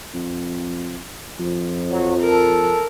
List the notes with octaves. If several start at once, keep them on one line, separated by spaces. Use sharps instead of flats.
F2
F2 F3
F#3
A4 A#4